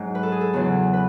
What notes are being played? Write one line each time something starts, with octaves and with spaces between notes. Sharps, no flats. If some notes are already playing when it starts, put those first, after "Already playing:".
Already playing: G#2 F#3
B4
A4
G#4
A4
E2 C#3 F#3
B4